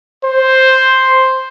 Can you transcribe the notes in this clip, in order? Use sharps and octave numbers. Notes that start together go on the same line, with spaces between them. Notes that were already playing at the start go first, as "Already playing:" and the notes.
C5